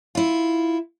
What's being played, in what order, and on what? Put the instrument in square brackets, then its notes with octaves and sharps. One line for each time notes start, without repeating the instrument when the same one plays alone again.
[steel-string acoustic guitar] E4 F4